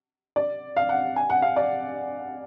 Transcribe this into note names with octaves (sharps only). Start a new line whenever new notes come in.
D5
F5
F#5
G#5
F#5
F5
D5